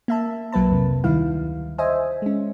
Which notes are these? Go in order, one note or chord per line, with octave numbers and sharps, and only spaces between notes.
A#3 E5 A5
B1 F#3 A#3 B4 A5
F2 C3
D2 D#3 G3 E4 F5
C5 D#5 E5 G#5
G#3 C#4